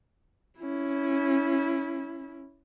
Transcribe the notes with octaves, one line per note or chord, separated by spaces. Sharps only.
C#4 E4